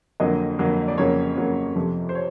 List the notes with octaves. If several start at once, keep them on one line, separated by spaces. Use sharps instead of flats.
F2 D3 F#3 A#3 D#5
F2 D3 F#3 A#3
D5
F2 C#3 F#3 A#3 C#5
F2 C#3 F#3 A#3
F2 C3 F3 A3
C5
C#5